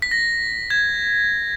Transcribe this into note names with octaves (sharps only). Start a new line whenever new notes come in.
B6
A#6
G#6